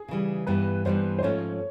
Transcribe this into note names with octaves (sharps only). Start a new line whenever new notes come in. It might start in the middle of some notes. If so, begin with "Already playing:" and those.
Already playing: G#4
C#3 E3 G3
G2 E3 G3 B3 B4
G2 E3 G3 B3 C5
C5
G#2 F3 A3 C#4 F4 C#5